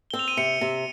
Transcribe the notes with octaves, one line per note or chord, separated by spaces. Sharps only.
C4 G7
F7
D#7
C3 C#7
C3